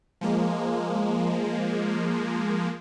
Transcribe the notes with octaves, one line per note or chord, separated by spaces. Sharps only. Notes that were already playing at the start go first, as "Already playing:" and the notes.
F3 G#3 A#3